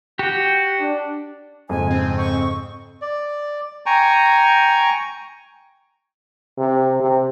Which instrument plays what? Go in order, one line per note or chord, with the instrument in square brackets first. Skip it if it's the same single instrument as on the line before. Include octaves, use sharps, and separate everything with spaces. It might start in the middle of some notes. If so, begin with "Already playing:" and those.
[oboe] F#4 [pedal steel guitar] G4 G5
[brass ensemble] D4
[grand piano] F2 G#2 C#3 [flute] G#5
[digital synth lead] C4
[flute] C#6
[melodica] D5
G5 G#5 A#5 C#6
[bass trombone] C3
C3